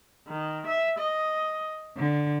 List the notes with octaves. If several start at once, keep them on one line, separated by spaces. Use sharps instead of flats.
D#3
E5
D#5
D3